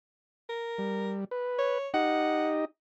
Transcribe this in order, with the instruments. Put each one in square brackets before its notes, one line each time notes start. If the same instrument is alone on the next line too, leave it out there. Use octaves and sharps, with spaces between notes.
[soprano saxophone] A#4
[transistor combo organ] G3
B4
[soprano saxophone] C#5
[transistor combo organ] D#4 G4 D#5 [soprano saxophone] F#5